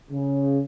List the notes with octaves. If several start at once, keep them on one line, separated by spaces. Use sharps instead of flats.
C#3